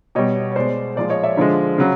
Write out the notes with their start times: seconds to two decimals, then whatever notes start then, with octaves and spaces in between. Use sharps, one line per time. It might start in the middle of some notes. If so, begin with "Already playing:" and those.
0.15 B2 G3 C#5 D#5
0.52 C#5
0.56 B2 G#3 C5 D5
0.96 A#2 F3 G#3 C5 D5
1.10 C#5 D#5
1.24 D5 E5
1.37 D3 F3 G#3
1.78 C#3 F#3